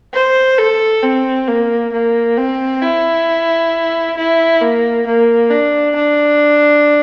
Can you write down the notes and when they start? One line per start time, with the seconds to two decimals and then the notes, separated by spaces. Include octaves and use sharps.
0.14 C5
0.58 A4
1.03 C4
1.48 A#3
1.93 A#3
2.37 C4
2.83 E4
4.17 E4
4.61 A#3
5.06 A#3
5.51 D4
5.96 D4